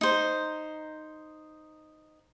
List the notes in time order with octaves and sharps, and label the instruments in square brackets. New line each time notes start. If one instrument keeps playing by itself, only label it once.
[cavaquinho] D#4 C5